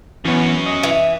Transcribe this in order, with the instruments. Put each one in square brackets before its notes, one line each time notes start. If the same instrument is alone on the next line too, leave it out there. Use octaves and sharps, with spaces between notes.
[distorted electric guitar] F#2 C#4 [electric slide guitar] E3 B3
[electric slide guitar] D#5
[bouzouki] E3 [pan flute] E5